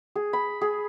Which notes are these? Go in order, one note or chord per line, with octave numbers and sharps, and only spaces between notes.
G#4
B5
G#4